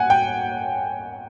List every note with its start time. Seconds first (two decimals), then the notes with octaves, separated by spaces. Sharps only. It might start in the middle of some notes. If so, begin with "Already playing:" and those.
Already playing: F#5 G#5
0.10 G5